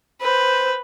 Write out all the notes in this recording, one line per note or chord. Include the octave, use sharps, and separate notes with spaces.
B4 C5